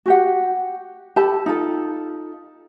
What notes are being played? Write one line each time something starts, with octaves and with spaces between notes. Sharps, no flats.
F#4 G4 F#5
G4 A4 A5 B5
D#4 F4 A4